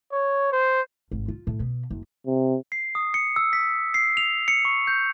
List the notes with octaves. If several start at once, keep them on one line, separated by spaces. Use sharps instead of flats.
C#5
C5
G#1
F4
A2
B2
F#1
C3
C7
D#6
C#7
E6
B6
C7
F7
C#7
C#6
G6